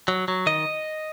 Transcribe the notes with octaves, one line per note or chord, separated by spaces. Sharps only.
F#3
F#3
D#3 D#5